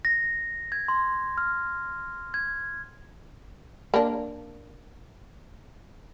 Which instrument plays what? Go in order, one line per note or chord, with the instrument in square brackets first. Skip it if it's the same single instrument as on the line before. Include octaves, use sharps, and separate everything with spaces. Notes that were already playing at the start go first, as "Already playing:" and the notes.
[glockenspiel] A#6
G#6
C6
F6
G#6
[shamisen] A#3 D4